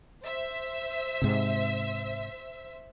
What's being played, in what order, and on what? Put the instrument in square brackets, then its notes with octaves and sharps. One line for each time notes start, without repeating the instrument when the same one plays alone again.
[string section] C5 E5
[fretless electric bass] G#2 C3